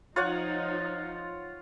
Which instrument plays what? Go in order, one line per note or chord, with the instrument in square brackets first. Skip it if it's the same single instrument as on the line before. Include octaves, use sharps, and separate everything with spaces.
[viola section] F3 D#4 [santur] F4 C#5 F#5